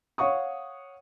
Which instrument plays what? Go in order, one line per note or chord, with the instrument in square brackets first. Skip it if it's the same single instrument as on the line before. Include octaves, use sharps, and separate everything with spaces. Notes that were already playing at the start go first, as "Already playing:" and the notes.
[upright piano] C#5 F5 F#5 C#6 D#6